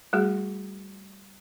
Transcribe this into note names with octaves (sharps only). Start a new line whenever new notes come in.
G3 A3 F#4 G#4